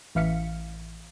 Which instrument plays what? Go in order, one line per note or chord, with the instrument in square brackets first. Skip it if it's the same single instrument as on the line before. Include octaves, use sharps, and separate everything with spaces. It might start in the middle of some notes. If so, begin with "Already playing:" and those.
[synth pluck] A1 E3 E5 F5 B6 C#7